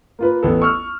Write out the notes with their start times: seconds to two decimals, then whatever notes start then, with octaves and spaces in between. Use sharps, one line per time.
0.19 A#3 F4 B4
0.43 A1 B3 A4
0.62 C#6 E6 F6